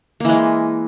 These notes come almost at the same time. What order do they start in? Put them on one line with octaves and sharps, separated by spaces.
A#3 E3 G#3